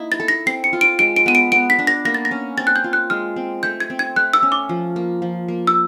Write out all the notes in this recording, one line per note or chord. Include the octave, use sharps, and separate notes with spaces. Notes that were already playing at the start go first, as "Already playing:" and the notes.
Already playing: A#3 D#4 E4
A6
A4
A#6
C4 C7
C#7
F4
D7
G#3 D7
D7
B3 D#7
D7
B3 D7
B6
D4
A#6
A#3 A#6
A6
A#6
C#4
C4 A6
F#6
G6
F4
F#6
G#3 F6
C4
A3 G6
G#6
C4
G#6
A3 F#6
E6
C#4
D6
F3
A#3
F3
A#3
E6